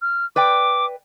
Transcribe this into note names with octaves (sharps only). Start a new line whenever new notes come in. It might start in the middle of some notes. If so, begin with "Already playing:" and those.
F6
B4 D5 G5 D6